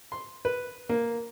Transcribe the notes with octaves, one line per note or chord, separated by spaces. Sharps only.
C6
B4
A#3